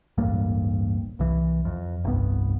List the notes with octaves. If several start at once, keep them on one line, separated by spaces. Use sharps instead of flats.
D1 A1 G2 A#3
C2 E3
F2
F1 C2 G2 B3